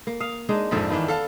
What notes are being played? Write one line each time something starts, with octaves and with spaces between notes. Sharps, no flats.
A#3
F5 D#6
G#3 D4 D#4
A#1 F2 G#2 D4 D#4 A4
G1 D#3 E3 B3 D4
A4 F5 A5